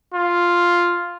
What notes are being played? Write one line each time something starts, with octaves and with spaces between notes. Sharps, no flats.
F4